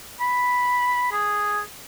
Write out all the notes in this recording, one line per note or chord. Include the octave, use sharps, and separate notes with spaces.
B5
G#4